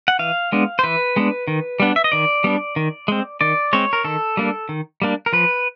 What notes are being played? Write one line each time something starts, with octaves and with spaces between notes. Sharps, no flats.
F#5
E3 F5
G#3 B3 D4
C5
E3 B4
G#3 B3 D4
D#3
G3 B3 D4
E5
D#5
D#3 D5
G3 B3 D4
D#3
G#3 C4
D#3 D5
G#3 C4 C#5
A#4
D#3 A4
G3 A#3 D4
D#3
G3 A#3 D4
A#4
F3 B4